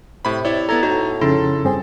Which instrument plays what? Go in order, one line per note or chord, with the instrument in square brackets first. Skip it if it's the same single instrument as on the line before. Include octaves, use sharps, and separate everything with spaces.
[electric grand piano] A2 B5 [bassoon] C3
[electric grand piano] E4 C#5 [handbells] D5
[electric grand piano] B3 E4 A4 [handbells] A#5 G#6 A6
[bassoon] A2 [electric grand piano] D#4 [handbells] F#4
[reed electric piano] F2 C#3 [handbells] D#4 E4 C6 [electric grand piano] A4
[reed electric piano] G2 C4 [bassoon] G#4